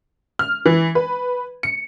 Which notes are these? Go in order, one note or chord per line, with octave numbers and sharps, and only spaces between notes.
F6
E3
B4
C#7